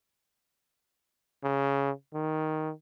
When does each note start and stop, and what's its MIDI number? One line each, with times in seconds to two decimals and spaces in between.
1.44 1.91 49
2.14 2.72 51